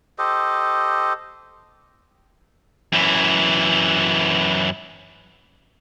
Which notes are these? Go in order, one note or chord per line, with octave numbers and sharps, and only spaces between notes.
G4 A4 C5 D#5
F#2 E3